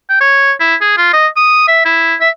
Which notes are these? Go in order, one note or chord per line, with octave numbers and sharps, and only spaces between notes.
G5
C#5
E4
G#4
F4
D#5
D#6
E5
E4
E5